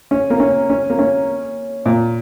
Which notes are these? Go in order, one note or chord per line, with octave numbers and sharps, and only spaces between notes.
C#4
A#3
C#4
C#4
A#3
C#4
A#2